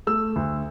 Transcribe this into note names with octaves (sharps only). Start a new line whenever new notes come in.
A3 E6
D2